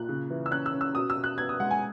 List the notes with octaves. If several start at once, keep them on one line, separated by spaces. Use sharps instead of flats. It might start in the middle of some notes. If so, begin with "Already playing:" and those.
Already playing: A#2 F#6
C#3
E3
E6
C#4 F#6
E6
C#4
E6
B2 D#6
E6
B2
F#6
B3 G#6
D#6
G#3 F#5
G#5